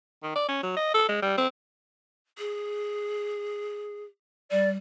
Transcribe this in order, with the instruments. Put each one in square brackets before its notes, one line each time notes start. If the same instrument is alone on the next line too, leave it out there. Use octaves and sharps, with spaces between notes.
[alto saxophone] D#3
D5
C#4
F#3
D#5
A4
G#3
G3
C4
[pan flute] G#4
[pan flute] G3 [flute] D5